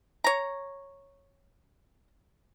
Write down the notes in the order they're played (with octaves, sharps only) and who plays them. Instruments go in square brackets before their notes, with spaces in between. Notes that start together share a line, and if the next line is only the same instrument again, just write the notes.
[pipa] C#5 A#5